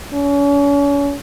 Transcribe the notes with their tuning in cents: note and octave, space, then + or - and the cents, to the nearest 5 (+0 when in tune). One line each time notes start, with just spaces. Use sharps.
C#4 +35